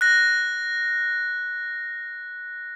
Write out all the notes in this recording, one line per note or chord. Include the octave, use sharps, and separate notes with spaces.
F#6 A#6